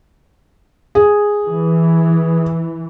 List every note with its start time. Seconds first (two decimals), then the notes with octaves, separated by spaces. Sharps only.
0.95 G#4
1.45 E3